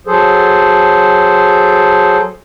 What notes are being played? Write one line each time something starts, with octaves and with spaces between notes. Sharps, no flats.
F#3 G#4 A4 C5